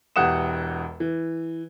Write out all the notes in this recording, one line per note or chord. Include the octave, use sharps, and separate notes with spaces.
E1 E2 G4 F#5 D#6 E7
E3